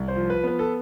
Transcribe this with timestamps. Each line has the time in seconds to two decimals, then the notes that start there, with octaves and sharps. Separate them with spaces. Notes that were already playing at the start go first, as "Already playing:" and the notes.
Already playing: C2
0.08 C5
0.16 F3
0.30 B4
0.43 B3 B4
0.59 A4